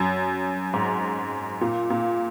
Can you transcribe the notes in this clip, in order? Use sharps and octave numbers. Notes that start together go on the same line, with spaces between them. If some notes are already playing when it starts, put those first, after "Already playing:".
Already playing: F#2
G#2
A#2
A#2